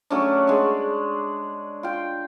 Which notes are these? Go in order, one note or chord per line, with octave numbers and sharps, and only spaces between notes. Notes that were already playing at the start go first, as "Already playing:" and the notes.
F#3 A3 C#4 D4
G#3 D4
F4 G5